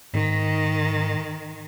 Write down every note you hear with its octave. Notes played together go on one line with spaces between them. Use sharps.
G#2 D#3